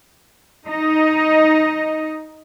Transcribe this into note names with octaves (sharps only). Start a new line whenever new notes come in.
D#4 D#5